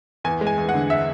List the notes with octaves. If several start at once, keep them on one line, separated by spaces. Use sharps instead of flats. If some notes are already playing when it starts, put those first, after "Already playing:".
E2 G#5
G#3
G#5
E2
F#5
D3
E5